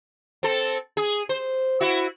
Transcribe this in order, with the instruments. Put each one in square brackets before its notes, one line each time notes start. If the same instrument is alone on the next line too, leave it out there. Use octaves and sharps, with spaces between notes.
[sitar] C4 A4
G#4
C5
E4 F#4